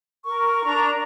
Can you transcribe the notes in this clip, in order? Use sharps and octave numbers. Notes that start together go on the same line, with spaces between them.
A#4 C#6
D4 A#5